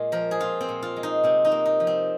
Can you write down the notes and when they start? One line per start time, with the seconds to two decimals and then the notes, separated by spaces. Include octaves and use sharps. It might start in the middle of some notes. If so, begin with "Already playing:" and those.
Already playing: A#2 G#3 F4
0.12 F3 A#4
0.31 G#4
0.40 C4 F4
0.61 C4
0.69 A#2
0.82 F4
0.96 G#3
1.03 D#4
1.24 C3 C4
1.45 D#4
1.52 A#3
1.66 D#4
1.80 F3
1.87 C4